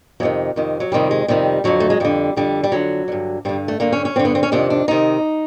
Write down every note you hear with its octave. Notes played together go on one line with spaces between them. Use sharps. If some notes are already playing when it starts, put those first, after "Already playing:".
F2 C3 D#3 F#3
F2 C3 D#3
F#3
F2 C3 D#3 G3
G#3
F2 C3 D#3 G3
F2 D3 F#3
A3
G#3
F2 D3 G3
F2 D3 G3
G3
F2 D3 F#3
G2 D3
G2 D3 G3
A3
G2 D3 A#3
C#4
C#4
G2 D3 C4
B3
C4
C#4
F2 C3 D#3 D4
D4
C3 D#3 D#4